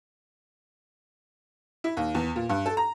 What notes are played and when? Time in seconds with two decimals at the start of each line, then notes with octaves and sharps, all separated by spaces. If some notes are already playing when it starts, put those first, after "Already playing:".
1.84 E4
1.97 D#2
2.15 E2
2.36 A#2
2.49 G2
2.66 A4
2.77 A#5